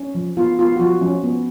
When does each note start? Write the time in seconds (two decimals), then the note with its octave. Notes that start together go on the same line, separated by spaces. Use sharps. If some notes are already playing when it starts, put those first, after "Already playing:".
Already playing: C#4
0.15 F3
0.37 B3 F4
0.59 B3 F4
0.76 F#4
0.79 F3 F4
1.01 F3 C#4
1.24 B3